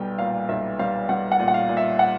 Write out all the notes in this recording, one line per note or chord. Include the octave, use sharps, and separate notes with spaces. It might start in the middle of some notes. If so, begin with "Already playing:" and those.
Already playing: B1 G3 B3 G5
A#2 F5
B1 E5
G3 F5
G3 F#5
F#5
A#2
F#5
F5
A#2
E5
F#5